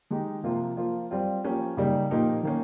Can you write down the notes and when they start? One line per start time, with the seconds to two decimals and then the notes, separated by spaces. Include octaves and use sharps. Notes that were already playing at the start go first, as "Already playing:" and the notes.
0.11 D#3 G#3 D#4 G4
0.44 C3 F3 A#3 F4
0.77 F3 A#3 F4
1.11 G3 C4 F4
1.44 F3 A#3 C#4 G4
1.77 C#3 G3 A#3 D#4 G4
2.10 A#2 F3 A#3 D#4 G4
2.43 D#3 A#3 C#4